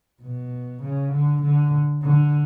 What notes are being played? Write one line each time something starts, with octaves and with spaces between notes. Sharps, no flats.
B2
C#3
D3
D3
D3